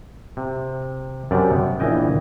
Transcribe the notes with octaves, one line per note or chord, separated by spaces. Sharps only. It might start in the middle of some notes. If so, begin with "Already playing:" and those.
C3
F#2 C3 G3 D5
B3
A#1 E3 D#5 G5